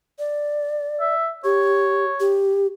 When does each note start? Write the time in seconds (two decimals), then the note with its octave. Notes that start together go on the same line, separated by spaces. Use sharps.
0.19 D5
1.00 E5
1.44 G4 C#5
2.20 G4